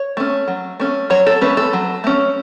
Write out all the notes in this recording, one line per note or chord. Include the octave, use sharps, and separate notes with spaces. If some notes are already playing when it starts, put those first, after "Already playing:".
Already playing: C#5
A3 C#4
F#3
A3 C#4
F#3 C#5
A4
A3 C#4 B4
A4
F#3
A3 C#4